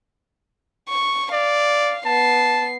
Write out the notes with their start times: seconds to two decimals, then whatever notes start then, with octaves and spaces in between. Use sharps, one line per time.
0.89 C#6
1.33 D5 F5
2.06 B3 A5 C7